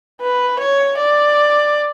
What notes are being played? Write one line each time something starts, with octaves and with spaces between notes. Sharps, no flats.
B4
C#5
D5